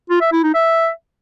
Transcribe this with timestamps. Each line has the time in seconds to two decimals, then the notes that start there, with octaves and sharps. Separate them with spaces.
0.10 F4
0.21 E5
0.32 E4
0.43 D#4
0.55 E5